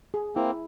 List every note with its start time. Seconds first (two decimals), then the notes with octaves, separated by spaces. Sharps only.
0.14 G#4
0.35 A#3 C4 E4